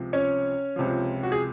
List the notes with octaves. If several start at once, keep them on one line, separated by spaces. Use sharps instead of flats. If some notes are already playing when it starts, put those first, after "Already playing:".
Already playing: C#2 C3 F3
C#4 C#5
C#2 C3 F3
F#4
G#4